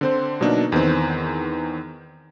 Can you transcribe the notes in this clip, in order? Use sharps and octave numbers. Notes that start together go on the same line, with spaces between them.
D3 C4 C5
B2 F#3 A#3 D4 D#4
E2 D#3 B3 C4